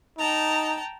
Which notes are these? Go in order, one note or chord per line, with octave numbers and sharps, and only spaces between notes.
D#4 G5 A5 A#5